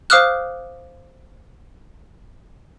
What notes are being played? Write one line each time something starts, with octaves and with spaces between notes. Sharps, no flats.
C5 F5 D6 D#6 F6 F#6